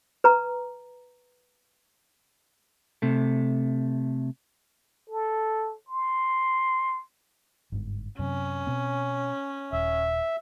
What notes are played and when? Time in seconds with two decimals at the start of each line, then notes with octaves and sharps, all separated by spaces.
0.24 B4 A#5
3.02 C3 A3
5.10 A4
5.88 C6
7.72 G1 G#2
8.19 F#2 C3 C#4
8.67 B2 C4
9.73 D#1 E5